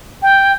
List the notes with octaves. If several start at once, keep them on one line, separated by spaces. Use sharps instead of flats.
G5